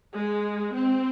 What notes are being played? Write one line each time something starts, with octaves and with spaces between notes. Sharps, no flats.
G#3
C4